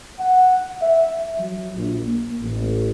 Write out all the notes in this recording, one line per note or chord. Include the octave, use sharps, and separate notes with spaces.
F#5
E5
F#3
A#1
A#3
A1